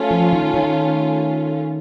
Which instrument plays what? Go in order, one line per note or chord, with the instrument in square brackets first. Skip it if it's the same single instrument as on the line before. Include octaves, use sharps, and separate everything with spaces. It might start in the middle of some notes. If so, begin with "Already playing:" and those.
Already playing: [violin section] A3 C#4 F4
[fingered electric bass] F3
D#3
D#3